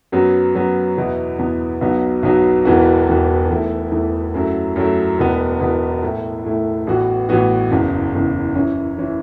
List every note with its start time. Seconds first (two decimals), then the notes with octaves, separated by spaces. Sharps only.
0.12 F#2 F#3 B3
0.55 F#2 F#3 B3
0.97 E2 B2 B3 E4
1.39 E2 B2 B3 E4
1.81 B1 B2 F#3 B3
2.23 B1 B2 F#3 B3
2.65 E1 E2 E3 B3 F#4
3.07 E1 E2 E3 B3 F#4
3.49 E2 E3 A3 E4
3.92 E2 E3 A3 E4
4.34 F#2 F#3 A3 E4
4.76 F#2 F#3 A3 E4
5.18 E1 E2 B2 B3
5.60 E1 E2 B2 B3
6.03 A2 A3 E4
6.45 A2 A3 E4
6.87 A1 A2 E3 B3 F#4
7.29 A1 A2 E3 B3 F#4
7.70 F#1 E2 C#3
8.12 F#1 E2 C#3
8.55 F#2 E3 C#4 E4
8.98 E3 C#4 E4